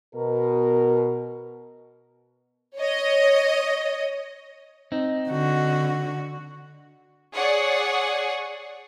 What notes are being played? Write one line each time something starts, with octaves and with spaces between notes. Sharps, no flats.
B2 A#4
C#5 D#5
C4 D#4
D3 F#4
G#4 C#5 D5 F#5